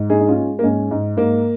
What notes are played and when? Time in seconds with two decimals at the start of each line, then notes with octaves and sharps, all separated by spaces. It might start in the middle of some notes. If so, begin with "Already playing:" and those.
Already playing: G#2
0.10 G#3 D#4 G#4
0.20 D#4
0.28 C#4 F4
0.37 G#3
0.59 A#3
0.63 G#2 G#3 C#4
0.91 G#2
1.17 G#2 A#3